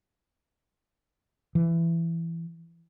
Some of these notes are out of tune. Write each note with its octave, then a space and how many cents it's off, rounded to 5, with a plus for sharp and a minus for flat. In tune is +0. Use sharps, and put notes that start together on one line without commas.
E3 +15